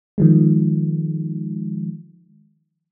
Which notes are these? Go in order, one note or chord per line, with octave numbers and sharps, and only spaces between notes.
D#3 F3 G#3